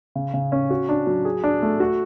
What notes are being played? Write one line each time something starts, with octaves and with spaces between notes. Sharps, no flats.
C#3
C#3
C#4
F#4
D4
F#3
G#4
D4
A3
F#4